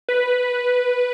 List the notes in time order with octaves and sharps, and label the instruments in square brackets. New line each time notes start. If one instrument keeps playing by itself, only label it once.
[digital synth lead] B4